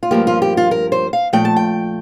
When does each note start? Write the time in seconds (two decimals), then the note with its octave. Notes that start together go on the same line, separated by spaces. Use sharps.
0.03 F4
0.11 G2 F3 A#3 G4
0.27 F4
0.42 G4
0.57 F4
0.71 A#4
0.92 C5
1.13 F5
1.33 A#2 F3 A3 G5
1.45 A5
1.56 G5